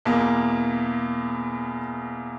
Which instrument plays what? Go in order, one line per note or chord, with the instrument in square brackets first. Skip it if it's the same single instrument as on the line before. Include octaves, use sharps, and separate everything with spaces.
[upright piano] E2 B2 A#3